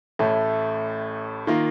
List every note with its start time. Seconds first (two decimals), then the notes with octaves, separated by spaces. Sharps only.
0.19 A1 A2 A3
1.47 D#3 A#3 F4